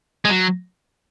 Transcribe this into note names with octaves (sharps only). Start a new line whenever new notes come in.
G#3
F#3